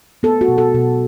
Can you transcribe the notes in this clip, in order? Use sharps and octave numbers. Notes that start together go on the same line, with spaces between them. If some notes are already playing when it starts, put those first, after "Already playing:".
B3 A4
F#4
B2
A4
B2